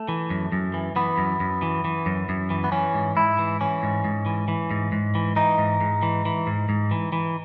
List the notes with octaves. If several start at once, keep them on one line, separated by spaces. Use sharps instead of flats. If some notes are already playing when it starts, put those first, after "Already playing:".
Already playing: A3
E3
F#2
F#2
E3
E3 B3
F#2
F#2
E3
E3
F#2
F#2
E3
B3
E3 C#4
G#2
G#2 E4
E3
E3 C#4
G#2
G#2
E3
E3
G#2
G#2
E3
E3 D#4
G#2
G#2
E3
E3
G#2
G#2
E3
E3